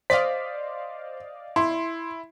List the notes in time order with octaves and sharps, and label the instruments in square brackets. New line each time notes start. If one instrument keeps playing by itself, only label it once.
[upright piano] C5 [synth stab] D5 D#5 F5 [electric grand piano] B6
[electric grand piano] E4 [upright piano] C6